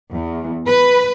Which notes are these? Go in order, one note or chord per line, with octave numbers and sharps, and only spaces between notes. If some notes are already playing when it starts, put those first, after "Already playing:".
E2
B4